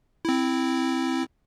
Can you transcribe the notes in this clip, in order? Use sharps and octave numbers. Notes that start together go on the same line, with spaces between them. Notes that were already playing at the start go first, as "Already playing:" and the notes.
C4 E4